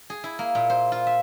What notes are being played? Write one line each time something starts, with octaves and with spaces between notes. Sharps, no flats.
G#4
E4
A#3
A#2
C5
F4
E5